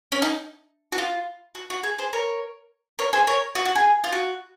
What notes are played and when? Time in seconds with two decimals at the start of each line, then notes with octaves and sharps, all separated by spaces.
0.12 C#4
0.22 D#4
0.92 F#4
0.98 F4
1.55 F#4
1.70 F#4
1.83 G#4
1.98 G#4 C5
2.13 A#4 C#5
2.99 A#4 C#5
3.13 G#4 C5
3.27 A#4 C#5
3.55 F#4
3.65 F#4
3.75 G#4
4.04 F4
4.12 F#4